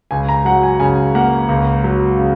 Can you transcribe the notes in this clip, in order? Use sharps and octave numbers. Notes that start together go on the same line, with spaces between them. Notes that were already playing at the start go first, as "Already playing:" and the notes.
C#2 G#5
A#5
F#3 F#5
G#5
C#3 G#5
A#3 F#5
C#2
F#3
C#3